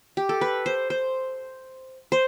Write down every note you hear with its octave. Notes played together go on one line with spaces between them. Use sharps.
G4
A4
B4
C5
C5
C5